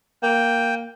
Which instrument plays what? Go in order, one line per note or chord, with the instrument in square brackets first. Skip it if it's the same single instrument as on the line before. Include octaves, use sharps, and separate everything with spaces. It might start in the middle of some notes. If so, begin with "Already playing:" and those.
[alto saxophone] A#3 [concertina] G5